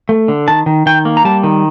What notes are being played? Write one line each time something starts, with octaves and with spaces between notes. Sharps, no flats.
A3
D3
D#3 A5
D#3
D#3 G5
A#3
A#5
G3 A5
D#3